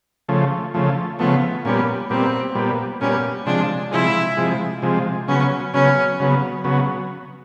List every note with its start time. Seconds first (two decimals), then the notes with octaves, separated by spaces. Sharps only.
0.29 C#3 F3 A3
0.74 C#3 F3 A3
1.19 C#3 F3 A3 B3
1.65 A#2 G3 B3 C#4
2.10 A#2 G3 B3 C4
2.55 A#2 G3 B3
3.01 A#2 G3 B3 C#4
3.46 C3 F3 G#3 D4
3.91 C3 F3 G#3 E4
4.37 C3 F3 G#3
4.82 C3 F3 G#3
5.28 C#3 F#3 B3 C#4
5.74 C#3 F#3 B3 C#4
6.19 C#3 F#3 B3
6.64 C#3 F#3 B3